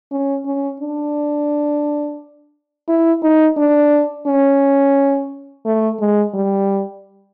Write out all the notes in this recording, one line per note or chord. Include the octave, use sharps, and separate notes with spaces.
C#4
C#4
D4
E4
D#4
D4
C#4
A3
G#3
G3